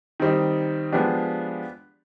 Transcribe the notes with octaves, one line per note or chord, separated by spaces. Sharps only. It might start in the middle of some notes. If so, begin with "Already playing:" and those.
D#3 G3 C4 D#4
F3 G#3 B3 D4 G4